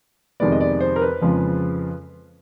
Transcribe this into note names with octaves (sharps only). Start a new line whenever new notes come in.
F2 C3 D#3 G#3 B3 D5
D#5
D5
C5
A#4
B4
F2 C#3 F3 G#3